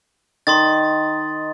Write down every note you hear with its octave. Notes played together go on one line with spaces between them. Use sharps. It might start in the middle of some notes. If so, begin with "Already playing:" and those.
D#3 C6 D#6 A6